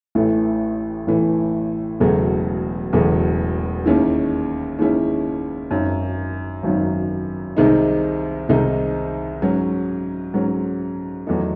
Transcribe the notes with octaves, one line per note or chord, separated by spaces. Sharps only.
A1 A2 E3 A3
A1 A2 E3 A3
E1 E2 C#3 F#3 A3
E1 E2 C#3 F#3 A3
D#2 D#3 G#3 C#4 E4
D#2 D#3 G#3 C#4 E4
G#1 F#2 D#3 F#3
G#1 F#2 D#3 F#3
C2 C3 D#3 G#3 D#4
C2 C3 D#3 G#3 D#4
G#2 F#3 C#4
G#2 F#3 C#4
E2 D#3 F#3 A3 D#4